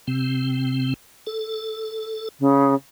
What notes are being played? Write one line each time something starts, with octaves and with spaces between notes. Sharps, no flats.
C3 C4
A4
C#3